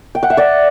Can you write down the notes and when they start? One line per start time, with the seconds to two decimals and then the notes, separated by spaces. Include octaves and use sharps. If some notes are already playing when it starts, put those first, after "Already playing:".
0.15 G5
0.23 F#5
0.30 E5
0.37 D5 F#5